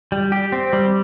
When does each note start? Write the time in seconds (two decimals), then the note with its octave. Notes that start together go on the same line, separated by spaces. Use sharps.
0.12 G3
0.32 G4
0.52 C4
0.73 G3